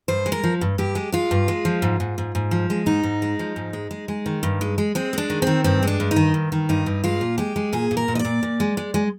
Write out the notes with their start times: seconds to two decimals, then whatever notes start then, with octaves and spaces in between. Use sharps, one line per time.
0.08 G2 C5
0.26 G#3
0.32 A#4
0.44 F3
0.61 G2
0.78 G2 G4
0.95 G#3
1.12 G#3 F4
1.31 G2
1.48 G#3
1.65 F3
1.82 G#2
2.00 G#2
2.18 G#2
2.35 G#2
2.51 F3
2.70 G#3
2.86 G#2 D#4
3.03 G#2
3.22 G#3
3.39 F3
3.56 G#2
3.73 G#3
3.91 G#3
4.08 G#3
4.26 D#3
4.43 G2
4.61 G#3
4.78 G#3
4.95 G#3 C4
5.13 G#3 D4
5.30 D#3
5.42 D#3 C4
5.64 G2 C4
5.83 G#3 D4
6.00 G2
6.11 D#4
6.16 D#3
6.34 G2
6.52 D#3
6.69 G2 D#4
6.86 G2
7.04 G#3 F4
7.21 A#2
7.38 G#3 G4
7.56 G#3
7.73 A#2 G#4
7.91 A#2
7.97 A#4
8.08 A#2
8.15 D#5
8.19 D5
8.25 A#2
8.43 A#2
8.60 G#3
8.77 G#3
8.94 G#3